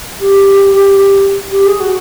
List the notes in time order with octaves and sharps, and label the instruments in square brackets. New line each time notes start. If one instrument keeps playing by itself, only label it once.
[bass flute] G4
G4
G#4
F#4